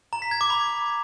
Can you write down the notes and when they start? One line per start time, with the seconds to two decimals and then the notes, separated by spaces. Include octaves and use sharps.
0.13 A#5
0.22 B6
0.31 G#6
0.41 D6
0.50 B5